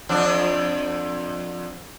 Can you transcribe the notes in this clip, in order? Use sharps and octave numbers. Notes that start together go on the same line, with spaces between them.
F2 D4